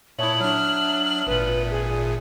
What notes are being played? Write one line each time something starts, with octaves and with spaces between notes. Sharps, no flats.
A#2 E4 C#5 E5 A5 D#6 F#7
F#3 D4 F6
F6
G#1 A#2 B4
G#4